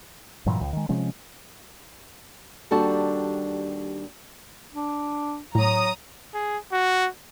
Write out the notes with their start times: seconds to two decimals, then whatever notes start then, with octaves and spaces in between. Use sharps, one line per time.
0.46 G2 A#2 E3 F#3
0.61 C#2
0.73 D#3 G#3
0.89 C3 F3 G#3 C#4
2.71 D#2 G3 D4 F#4 A4 A5
4.74 D4
5.55 A2 F#3 A#5 D#6
6.34 G#4
6.72 F#4